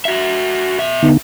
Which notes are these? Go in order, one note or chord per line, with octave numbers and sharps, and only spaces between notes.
F#4 E5
B2 E5
D3 B3 D#4